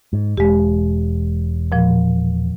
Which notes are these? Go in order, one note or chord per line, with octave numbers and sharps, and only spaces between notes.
G#2
E1 G#3 G4
A#2 F3